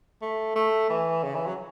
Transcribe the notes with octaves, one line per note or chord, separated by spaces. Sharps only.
A3
A3
E3
C#3
E3
F#3